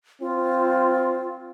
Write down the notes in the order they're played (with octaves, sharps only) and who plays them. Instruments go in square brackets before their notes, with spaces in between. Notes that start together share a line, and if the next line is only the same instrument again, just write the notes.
[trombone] C4 [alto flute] F4